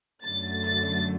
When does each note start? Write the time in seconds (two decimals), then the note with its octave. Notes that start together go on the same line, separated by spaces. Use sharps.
0.23 F#2 D3 F#3 A3 A6
0.67 A6